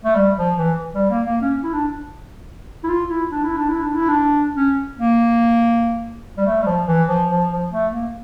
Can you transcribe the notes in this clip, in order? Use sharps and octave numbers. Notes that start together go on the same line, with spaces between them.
A3
G3
F3
E3
G3
A#3
A#3
C#4
E4
D4
E4
F4
E4
D4
E4
D4
E4
D4
E4
D4
C#4
A#3
G3
A3
G3
F3
E3
F3
F3
F3
A3
A#3